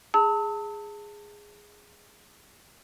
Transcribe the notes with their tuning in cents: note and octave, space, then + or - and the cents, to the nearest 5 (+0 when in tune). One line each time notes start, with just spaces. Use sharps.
G#4 -5 A5 +25 E6 -30